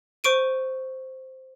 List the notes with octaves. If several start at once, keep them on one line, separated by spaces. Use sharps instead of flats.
C5 C#6 D7 D#7